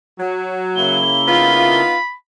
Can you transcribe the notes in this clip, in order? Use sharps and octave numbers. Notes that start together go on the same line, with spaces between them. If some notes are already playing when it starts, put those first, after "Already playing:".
F#3
C#3 A#3 E4 G7
B3 D#4 F4 B5